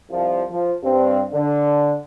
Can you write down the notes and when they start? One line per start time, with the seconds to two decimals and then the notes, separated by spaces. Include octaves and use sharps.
0.10 C2 F3
0.50 F3
0.83 G2 C4
1.33 D3